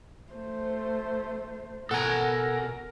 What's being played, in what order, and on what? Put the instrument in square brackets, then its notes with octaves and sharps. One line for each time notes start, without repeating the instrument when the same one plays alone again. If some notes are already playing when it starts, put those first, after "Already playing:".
[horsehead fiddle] A3 C5
[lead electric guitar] B2 [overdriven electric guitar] A4 A#5 [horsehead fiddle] A#4 [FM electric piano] F#5 G#5